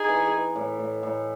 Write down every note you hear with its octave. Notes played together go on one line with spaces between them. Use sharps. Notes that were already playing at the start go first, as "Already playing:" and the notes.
Already playing: D#4 G#4
E3
E3
A2
A2
A2